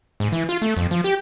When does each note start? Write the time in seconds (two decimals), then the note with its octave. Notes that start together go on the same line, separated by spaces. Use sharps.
0.20 G#2
0.32 E3
0.49 F4
0.62 A3
0.77 F2
0.91 F3
1.04 G4